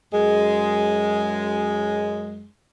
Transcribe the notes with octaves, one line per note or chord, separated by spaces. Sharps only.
F#2 G#3